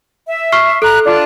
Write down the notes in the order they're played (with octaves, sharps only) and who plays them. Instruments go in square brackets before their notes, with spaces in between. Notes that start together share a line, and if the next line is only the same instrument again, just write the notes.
[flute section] E5
[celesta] C#6 F6 C7
[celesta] A4 [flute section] A#5 F#6
[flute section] D4 F4